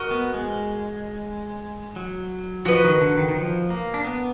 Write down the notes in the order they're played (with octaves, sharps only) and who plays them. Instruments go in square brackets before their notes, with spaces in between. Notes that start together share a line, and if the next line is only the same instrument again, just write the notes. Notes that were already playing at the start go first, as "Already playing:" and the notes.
Already playing: [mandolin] F#4 A#4 D#5
[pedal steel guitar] B3
G#3
F#3
[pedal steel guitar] F3 [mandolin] F#4 B4 D#5
[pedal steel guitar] D#3
D3
D#3
D#3
F3
A#3
D4
B3